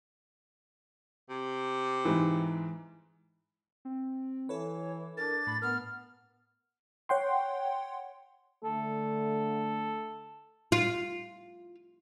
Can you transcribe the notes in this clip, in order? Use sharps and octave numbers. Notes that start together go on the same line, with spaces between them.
C3
G#2 E3
C4
E3 E4 A4 B4 C#5
D4 A#4 A6
A2 B5
B3 A#4 F6
C#5 F#5 G5 C6
D3 A3 A4
F4